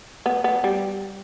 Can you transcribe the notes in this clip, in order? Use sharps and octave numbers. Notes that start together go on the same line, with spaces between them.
B3
B3
G3